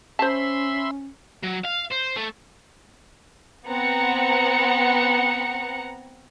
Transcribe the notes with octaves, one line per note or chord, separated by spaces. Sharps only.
C#4 C5 E5 A5 B5 C6
F#3
F5
C5
A3
B3 C4 F#5 A#5 C#7